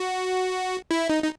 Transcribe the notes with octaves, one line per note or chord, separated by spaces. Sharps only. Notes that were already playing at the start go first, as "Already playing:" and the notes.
Already playing: F#4
E4
D#4
D#4